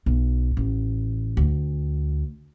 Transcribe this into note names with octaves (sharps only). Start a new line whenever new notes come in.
B1
A1
D2